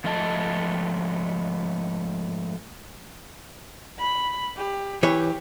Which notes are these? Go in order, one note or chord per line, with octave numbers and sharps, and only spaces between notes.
G#2 F3 A3 D#5 G#5 A5
B5
G4
E3 G4 C#5